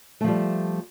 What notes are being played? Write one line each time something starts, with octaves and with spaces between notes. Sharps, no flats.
F3 G3 A3